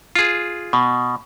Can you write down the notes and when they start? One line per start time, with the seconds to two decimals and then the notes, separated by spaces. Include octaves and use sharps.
0.15 F4 G#4
0.73 B2